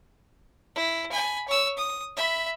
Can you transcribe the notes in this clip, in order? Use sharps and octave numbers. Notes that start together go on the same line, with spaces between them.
E4
G#5 B5
C#5 E6
D#6
E5 B5